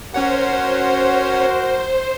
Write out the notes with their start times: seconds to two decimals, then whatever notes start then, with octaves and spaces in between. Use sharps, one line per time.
0.14 C#4 F#4 A#4 C5 C#5 F#5